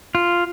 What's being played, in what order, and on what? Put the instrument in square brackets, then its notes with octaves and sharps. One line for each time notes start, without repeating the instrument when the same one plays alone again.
[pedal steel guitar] F4